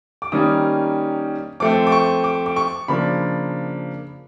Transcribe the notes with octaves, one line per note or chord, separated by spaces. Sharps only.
D6
D#3 G3 A#3 C#4 D#6
F3 A3 C4 D6
D6
C#6
D6
D6
C#6
C#3 F3 A#3 D4 B5